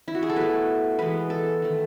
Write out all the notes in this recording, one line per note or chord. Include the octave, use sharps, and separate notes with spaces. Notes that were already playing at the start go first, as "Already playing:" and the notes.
E4
F#4
G#4
A4
B2 A3 B4
E3 G#3 B3 B4
A4
D#3 A3